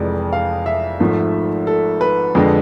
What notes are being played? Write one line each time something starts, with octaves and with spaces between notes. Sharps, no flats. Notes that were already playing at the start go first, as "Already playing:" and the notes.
Already playing: F1 F2 E3 G#3 D5
F5
E5
G#1 G#2 F3 A3
A4
B4
F2 D3 G#3